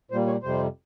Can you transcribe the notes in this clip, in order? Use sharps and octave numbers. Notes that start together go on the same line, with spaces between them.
A#2 G3 A#3 C5
C#5
F2 C3 G3 C5